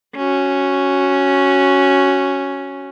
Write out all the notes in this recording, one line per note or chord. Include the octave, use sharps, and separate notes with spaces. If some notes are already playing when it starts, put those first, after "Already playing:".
C#4 F#4